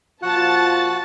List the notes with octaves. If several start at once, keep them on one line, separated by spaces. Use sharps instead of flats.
A#2 F3 F4 F#4 F#5 A5 A6